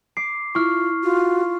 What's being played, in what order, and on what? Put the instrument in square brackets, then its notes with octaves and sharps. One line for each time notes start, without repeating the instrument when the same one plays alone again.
[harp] D6 [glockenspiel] C7
[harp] E4 [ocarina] F4 [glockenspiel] C#6 F6
[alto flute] F4 [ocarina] F#4